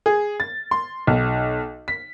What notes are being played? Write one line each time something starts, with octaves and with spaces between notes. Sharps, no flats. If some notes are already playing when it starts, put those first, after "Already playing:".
G#4
A6
C6
B1
B6